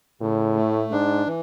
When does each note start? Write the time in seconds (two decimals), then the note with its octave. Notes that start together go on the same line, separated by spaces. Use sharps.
0.21 A2 C#3
0.56 A3
0.91 G#2 D4
1.27 E3